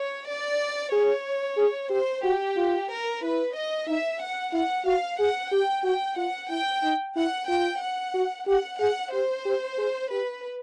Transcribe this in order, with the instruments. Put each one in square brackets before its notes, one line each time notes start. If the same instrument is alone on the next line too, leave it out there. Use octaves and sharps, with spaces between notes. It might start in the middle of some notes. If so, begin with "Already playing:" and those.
Already playing: [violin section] C#5
D5
[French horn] G#4 [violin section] C#5
[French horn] G#4
[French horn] G4 [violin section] C5
[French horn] F#4 [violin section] G4
[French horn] F4
[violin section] A#4
[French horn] E4 [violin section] B4
[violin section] D#5
[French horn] D#4 [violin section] E5
[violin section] F#5
[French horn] E4 [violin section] F#5
[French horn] F#4 [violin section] F5
[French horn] G#4 [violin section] F#5
[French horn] G4 [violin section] G5
[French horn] F#4 [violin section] G5
[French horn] F4 [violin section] F#5
[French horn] E4 [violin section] G5
[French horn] D#4
[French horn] E4 [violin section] F#5
[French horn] F4 [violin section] G5
[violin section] F#5
[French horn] F#4
[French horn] G4 [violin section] F#5
[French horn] G#4 [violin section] F#5
[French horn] G4 [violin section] C5
[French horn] G4
G#4
[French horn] G4 [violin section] B4